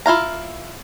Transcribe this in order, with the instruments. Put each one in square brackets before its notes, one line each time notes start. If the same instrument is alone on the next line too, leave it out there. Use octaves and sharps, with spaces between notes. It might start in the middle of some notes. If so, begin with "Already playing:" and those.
[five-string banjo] E4 F4 F5 A#5